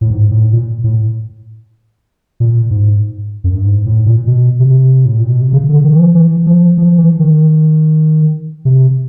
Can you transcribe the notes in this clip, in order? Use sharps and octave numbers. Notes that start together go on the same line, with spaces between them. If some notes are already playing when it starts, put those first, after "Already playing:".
A2
G#2
A2
A#2
A2
A#2
G#2
F#2
G2
G#2
A2
A#2
B2
C3
A2
A#2
B2
C3
C#3
D3
D#3
E3
F3
E3
F3
F3
E3
D#3
C3